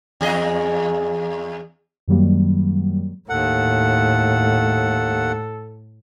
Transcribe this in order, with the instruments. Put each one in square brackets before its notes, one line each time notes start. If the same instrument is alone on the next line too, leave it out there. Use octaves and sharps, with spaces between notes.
[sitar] E2 G#4 D#5
[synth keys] F#2 D#3 F#3 G3 A#3
[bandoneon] D#2 F#5 [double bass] A2 [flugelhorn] A4